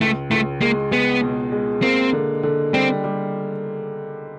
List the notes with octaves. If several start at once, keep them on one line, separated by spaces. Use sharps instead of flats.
C#2 A3
C#2 A3
G#3 A#3
G#3 B3
B2
G#3
A#3 C4
D3
D3
G3 C4
G3